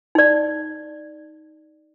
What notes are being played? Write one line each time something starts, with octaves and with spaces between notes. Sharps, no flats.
D#4 D5